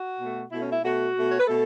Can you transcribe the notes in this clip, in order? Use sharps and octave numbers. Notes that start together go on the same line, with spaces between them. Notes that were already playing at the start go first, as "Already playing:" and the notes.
Already playing: F#4
B2 A3
B2 A3 E4
C#4
E4
B2 A3 F#4
B2 A3
C#5
B4
B2 A3 A4